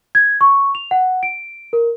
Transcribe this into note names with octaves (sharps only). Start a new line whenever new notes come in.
G#6
C#6
F7
F#5
D7
A#4